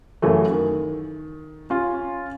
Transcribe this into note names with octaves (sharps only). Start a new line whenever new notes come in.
F#2 C#3 E3 F#3 A3
D#3
C#4 F4